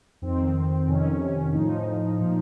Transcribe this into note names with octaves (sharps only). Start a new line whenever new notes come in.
F2 D#3 C4
F2 C3 D#3 C#4
A2 F3 D#4
A#2 F3